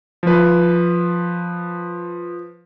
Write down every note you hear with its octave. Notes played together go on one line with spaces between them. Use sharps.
F3 B4